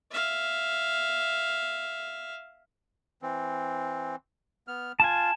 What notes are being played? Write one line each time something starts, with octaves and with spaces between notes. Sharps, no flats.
E5 F5
E3 C4
B3 F6
F4 G#5 A5